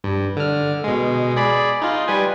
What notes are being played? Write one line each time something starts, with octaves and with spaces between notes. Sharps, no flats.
G2
D3 F6
B2 G#3
G#4 D5 B5
D#4 F4
G3 B4 G#5